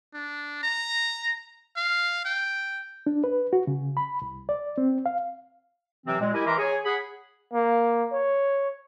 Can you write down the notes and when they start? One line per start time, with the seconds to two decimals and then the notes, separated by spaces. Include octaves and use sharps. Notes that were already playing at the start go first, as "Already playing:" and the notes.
0.14 D4
0.63 A#5
1.76 F5
2.25 G5
3.06 D4
3.24 B4
3.53 F#4
3.67 C#3
3.97 B5
4.22 C2
4.49 D5
4.78 C4
5.06 F5
6.06 C3 E3 F#3 C4
6.19 A#2 G#3
6.34 E4 G4 A#4 D#5 G#5
6.46 E3 A#4 E5 A#5 C6 D6
6.58 G#4 C#5 G#5
6.85 G#4 F#5 B5
7.53 A#3
8.12 C#5